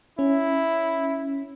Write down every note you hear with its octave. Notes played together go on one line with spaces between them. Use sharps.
C#4 E4